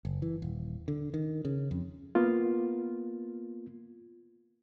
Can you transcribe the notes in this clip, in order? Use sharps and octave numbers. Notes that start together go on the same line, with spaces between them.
F#1
E3
D#1
D3
D#3
C#3
F2
A#3 B3 F4